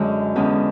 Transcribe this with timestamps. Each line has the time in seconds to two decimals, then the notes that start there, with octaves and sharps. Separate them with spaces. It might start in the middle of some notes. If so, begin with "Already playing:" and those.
Already playing: F#2 D3 G#3
0.36 E2 D3 G#3 C#4